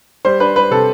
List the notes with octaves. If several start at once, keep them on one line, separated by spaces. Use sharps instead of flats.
G3 C5
D4 B4
G3 B4
C3 A4